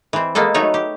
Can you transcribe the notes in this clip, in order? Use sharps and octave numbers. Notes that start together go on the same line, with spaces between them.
E3 C4
G#3 A#3 B3 A4
F#3 A3 D#4 B4 C#5
G4